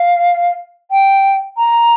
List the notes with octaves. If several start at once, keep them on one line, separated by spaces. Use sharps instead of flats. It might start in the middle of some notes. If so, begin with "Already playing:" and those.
Already playing: F5
G5
A#5